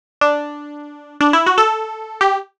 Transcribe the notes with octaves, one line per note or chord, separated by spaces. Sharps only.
D4
D4
E4
F#4
A4
G4